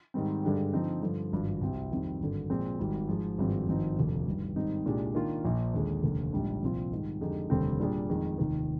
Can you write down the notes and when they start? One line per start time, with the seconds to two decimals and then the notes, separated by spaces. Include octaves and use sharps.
0.14 G#2 D#3 G3 C4
0.43 G2 D3 G#3 D4 G4
0.73 D3 F3 C4 D#4
1.02 G2 D3 F3
1.32 G#1 G2 F3
1.61 C2 C3 G3 C4
1.91 F2 D#3 G3 C4
2.20 G#1 G2 D3
2.50 A#2 F3 G#3 C4
2.79 G#1 G#2 G3
3.09 G#2 F3 G#3
3.38 G#1 G2 F3 G#3 C4
3.68 G#1 G2 F3 C4 D#4
3.97 F1 D#2 D3 F3
4.27 G2 D#3 G3
4.56 G#2 D#3 G3 C4 D#4
4.86 C2 A#2 G#3 D4 G4
5.15 D#3 A#3 D4 F4
5.44 A#1 A#2 F3
5.74 D#2 D3 G#3
6.03 F1 D#2 D3 F3
6.33 A#1 G#2 G3 D4
6.62 C2 A#2 F3 C4 F4
6.91 G#2 D#3 G3
7.21 F2 D3 G#3 D#4 G4
7.50 F1 D#2 D3 G3 C4
7.80 A#2 G3 D4 G#4 D5
8.10 F2 D#3 G#3
8.38 F1 D#2 D#3